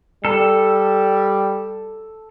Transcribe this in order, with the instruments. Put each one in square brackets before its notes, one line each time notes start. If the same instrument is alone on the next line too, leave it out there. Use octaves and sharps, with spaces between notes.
[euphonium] G3 [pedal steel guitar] A4